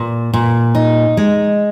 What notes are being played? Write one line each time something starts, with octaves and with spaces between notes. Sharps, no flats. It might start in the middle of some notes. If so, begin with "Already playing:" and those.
Already playing: A#2
A#2
D#4
G#3